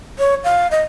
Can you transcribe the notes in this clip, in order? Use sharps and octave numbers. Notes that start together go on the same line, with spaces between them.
C#5
F5
D#5